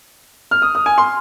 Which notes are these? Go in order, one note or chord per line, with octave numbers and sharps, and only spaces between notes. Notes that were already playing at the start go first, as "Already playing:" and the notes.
F6
D#6
D#6
G#5
C6